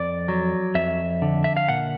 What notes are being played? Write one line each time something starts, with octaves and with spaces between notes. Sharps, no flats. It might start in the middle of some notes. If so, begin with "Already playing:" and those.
Already playing: F2 D5
F#3
F2 E5
D3
E5
F5
A#2 F#5